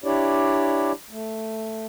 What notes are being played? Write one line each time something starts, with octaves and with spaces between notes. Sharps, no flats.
D4 E4 G4 C#5 D5
A3